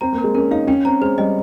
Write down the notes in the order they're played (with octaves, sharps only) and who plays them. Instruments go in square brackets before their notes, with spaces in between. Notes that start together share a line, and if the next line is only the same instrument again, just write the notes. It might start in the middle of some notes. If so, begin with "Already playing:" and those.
[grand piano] C4 [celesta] A#5
[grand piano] A#3
[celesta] A#4
[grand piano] G#3
[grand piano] C#4 [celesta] A#4
[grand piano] D#4 [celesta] F5
[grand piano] C#4 [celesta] G5
[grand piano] C4 [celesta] A#5
[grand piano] G#3 [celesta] C5
[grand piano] G3 [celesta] D#5